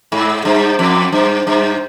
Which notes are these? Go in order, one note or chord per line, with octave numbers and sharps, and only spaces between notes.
G#2
G2
F2
G2
G2